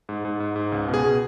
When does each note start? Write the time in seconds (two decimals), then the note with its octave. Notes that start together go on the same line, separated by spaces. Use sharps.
0.09 G#2
0.25 G#2
0.40 G#2
0.56 G#2
0.72 C#2
0.88 B2
0.94 G#4
1.05 B2